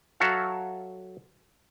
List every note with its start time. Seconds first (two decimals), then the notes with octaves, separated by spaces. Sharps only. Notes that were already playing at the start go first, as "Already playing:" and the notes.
0.20 F#3 F#4 A4 E5 F5